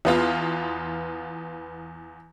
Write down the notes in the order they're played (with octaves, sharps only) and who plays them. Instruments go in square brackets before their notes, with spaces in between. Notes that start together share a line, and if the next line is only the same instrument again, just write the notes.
[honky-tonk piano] E2 B3 F4